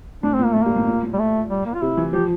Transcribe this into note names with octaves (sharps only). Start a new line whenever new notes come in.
A2 D4
C4
A#2
A#3
A2 A3
G2 A#3
A2
A#2
A2
G3
A3
G3
A#3
F4
C3 E4
E3
F3 G4